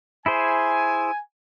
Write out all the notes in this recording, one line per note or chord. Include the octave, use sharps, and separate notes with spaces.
E4 G#4 C5 G#5